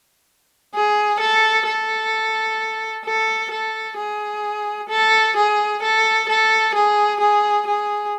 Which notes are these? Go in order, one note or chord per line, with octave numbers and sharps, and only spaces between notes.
G#4
A4
A4
A4
A4
G#4
A4
G#4
A4
A4
G#4
G#4
G#4